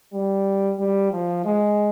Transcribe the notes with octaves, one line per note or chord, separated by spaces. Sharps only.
G3
G3
F3
G#3